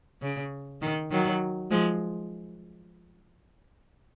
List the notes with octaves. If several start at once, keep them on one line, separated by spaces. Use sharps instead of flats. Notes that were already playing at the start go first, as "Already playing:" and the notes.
C#3
D#3
D#3 F#3
F3 G#3